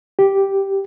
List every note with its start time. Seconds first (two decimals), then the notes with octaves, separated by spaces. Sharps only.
0.19 G4